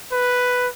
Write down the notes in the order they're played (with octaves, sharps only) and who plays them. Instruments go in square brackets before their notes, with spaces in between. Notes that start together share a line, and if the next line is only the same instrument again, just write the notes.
[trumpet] B4